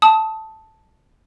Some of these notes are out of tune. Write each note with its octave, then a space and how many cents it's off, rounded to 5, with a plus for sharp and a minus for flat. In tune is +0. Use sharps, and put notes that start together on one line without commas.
A5 +0 D#6 +25